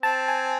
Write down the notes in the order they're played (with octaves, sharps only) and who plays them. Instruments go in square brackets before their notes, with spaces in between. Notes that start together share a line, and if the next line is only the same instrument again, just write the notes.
[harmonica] C4 [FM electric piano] A5
[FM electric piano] G#5